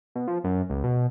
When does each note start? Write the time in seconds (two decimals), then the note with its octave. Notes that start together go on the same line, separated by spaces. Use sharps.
0.15 B2
0.28 F3
0.44 F#2
0.70 C#2
0.84 B2